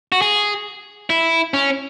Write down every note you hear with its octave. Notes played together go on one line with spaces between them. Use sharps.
F#4
G#4
E4
C#4